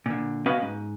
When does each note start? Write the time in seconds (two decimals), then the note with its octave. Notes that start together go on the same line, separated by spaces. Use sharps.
0.06 A#2 D3
0.46 B3 C#4 F#4 B4 D#5 F5
0.62 G#2